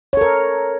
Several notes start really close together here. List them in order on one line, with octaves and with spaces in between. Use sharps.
C#5 A4 A#4